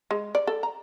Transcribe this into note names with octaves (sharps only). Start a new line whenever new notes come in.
G#3
D5
A4
A#5